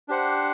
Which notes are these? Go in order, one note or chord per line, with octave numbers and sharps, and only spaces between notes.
D4 G4 C5 F#5